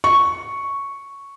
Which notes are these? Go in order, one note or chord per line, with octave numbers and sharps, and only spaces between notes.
C#6